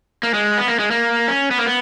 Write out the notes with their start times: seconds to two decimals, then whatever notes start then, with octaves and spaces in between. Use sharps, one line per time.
0.23 A#3
0.34 G#3
0.57 B3
0.68 A#3
0.79 G#3
0.91 A#3
1.28 C#4
1.51 B3
1.59 A#3
1.66 B3